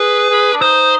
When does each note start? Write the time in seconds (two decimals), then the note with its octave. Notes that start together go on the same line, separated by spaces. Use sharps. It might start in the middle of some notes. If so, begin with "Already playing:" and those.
Already playing: G#4 B4
0.30 G#4
0.54 D4
0.62 D#4 C5